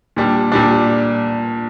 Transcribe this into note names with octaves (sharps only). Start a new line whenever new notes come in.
A#2 G3 D4
A#2 G3 D4